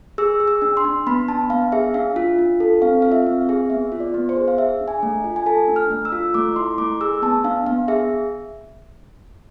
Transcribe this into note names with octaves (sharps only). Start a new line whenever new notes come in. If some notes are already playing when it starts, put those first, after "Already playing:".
G#4 E6
G#4
E6
D4
C6
D4
B3 B5
D4 A5
B3 F5
G#4 E5
D4 F5
F4
D4
A4
C4 F5
F4 F5
E5
C4
F5
G#4
B3 E5
F4
D5
B3
C5
G#4
F5
G#4 E5
D4
G#5
A3
F4
G#5
A4 A5
D4
F6
A3
E6
F4
A3 D6
E4 C6
A3 D6
G#4 E6
B3 A5
D4 F5
B3 F5
G#4 E5